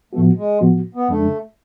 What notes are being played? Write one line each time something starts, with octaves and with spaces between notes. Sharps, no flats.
A2 F3 A3 B3 F#4
G#3
A2 F3 B3 F#4
B3
F2 C#3 G#3 A3 D4